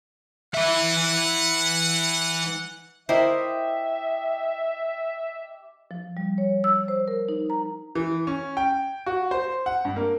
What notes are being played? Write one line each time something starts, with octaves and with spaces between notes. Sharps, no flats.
E3 E5 F#5
E4 G4 A#4 C5 D#5 E5
F3
G3
C#5
E6
C5
A#4
D#4
A#5
E3
C#4
G5
F#4
C5
F#5
G2
A#3